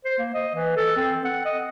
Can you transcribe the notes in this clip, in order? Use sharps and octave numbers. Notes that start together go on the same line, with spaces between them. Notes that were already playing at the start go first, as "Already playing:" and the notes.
C5
A#3
D#5
E3
A4
C4
F#5
D#5